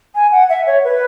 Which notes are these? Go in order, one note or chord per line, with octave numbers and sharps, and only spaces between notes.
G#5
F#5
E5
C#5
B4